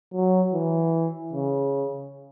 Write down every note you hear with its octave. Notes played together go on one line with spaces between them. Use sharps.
F#3
E3
C#3